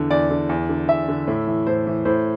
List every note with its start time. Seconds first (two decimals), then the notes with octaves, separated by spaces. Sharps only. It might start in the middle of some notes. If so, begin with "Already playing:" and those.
Already playing: E2 D3
0.10 E2 D5
0.30 D3
0.49 E2
0.69 D3
0.88 E2 E5
1.08 D3
1.27 A2
1.47 E3
1.67 A2 C5
1.87 E3
2.05 A2 C5